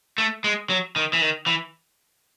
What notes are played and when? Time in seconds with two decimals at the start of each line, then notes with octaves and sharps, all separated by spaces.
0.18 A3
0.44 G#3
0.70 F#3
0.96 D#3
1.13 E3
1.21 D#3
1.46 E3